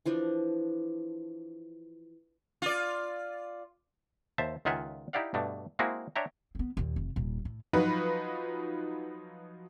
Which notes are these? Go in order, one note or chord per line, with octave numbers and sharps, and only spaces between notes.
E3 F3 D4
F4 D5
D#2 C5 E5 A5
C#2 D#3 F4 E5 F#5 G#5
D#4 E4 G4 D5 F5 F#5
G2 B2 A3 D4
G#3 A#3 C4 E4 F#4 G#4
D4 C#5 E5 G5 A#5
B3 C4
D#2 A#2
F1
D#1 A#2
A2
F3 F#3 D#4 F4 F#4 B4